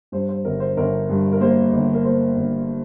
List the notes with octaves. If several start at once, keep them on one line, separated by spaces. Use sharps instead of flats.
G2 C5
C5
G1 A#4
C5
G1 A#4
G2
A#4
A#3 C5
G1
A#4
A#3 C5
G1